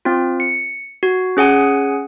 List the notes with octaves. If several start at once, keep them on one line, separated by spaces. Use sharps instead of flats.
C4 F4
C#7
F#4
C#4 G#4 F#5 G#5